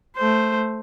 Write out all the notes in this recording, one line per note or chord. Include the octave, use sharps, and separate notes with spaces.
A3 C5